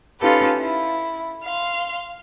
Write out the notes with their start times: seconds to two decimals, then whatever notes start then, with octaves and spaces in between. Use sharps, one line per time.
0.20 C#4 D#4 F4 G4 A4 B4
0.57 E4
1.44 F5 C6